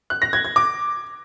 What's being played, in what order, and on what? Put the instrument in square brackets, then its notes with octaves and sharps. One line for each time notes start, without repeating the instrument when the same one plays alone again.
[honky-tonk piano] F#6
A#6
G#6
G#6
D6